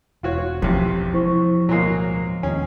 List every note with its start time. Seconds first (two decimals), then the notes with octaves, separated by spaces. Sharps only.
0.23 E1 F4 F#4 C#5
0.62 A1 A2 C3 F3
1.14 E4 C5 C#6
1.69 D1 B2 F#3 G#3 A#3 C#5 C7
2.43 D#2 G#3 C#4 G#4